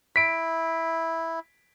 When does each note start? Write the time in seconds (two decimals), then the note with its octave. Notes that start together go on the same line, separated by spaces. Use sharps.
0.16 E4 B6 D7